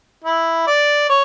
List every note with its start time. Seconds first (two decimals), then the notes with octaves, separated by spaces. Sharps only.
0.24 E4
0.67 D5
1.09 C#5